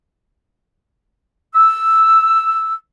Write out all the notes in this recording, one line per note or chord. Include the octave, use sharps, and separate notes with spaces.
E6